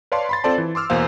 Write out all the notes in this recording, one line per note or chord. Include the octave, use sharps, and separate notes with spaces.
B4 C#5 D5 F5 A5 C6
B5 C6 A6
C4 F4 A4 C5 D5 A5
E3
C6 D6 E6 F6
E2 B2 A#3 C5 F5